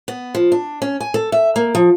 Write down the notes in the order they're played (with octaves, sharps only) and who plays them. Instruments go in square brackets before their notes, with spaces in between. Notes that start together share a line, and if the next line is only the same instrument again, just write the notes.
[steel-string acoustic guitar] B3
F3
D4
C#4
G#5
A4
E5
A#3
F3